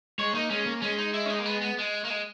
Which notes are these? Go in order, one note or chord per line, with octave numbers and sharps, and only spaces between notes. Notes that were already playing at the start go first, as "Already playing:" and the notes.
G#3 C#5
A#3 D#4
G#3 C#4
A#3
G#3 C#4
D#4
E4
C#4
D#4
A#3
B3
B3
G#3
A#3
G#3